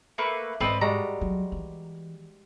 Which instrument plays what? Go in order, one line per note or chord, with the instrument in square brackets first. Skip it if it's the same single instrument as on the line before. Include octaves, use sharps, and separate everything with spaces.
[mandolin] A3 A#3 B4
[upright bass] G#2 [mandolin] C4 B4 [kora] A4 D5 D#5
[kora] G3 G#3 F#4 [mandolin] A#5
[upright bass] F#3
E3